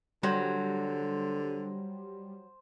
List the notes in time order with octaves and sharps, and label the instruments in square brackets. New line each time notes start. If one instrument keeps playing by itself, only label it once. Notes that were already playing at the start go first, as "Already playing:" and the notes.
[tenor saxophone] D3 [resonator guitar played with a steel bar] F#3 [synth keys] G3 [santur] C5 A#5